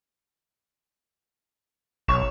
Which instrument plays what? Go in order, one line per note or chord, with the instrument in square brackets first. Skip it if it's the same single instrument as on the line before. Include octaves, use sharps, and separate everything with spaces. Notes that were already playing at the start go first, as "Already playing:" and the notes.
[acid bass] B1 [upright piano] C#5 C#6 E7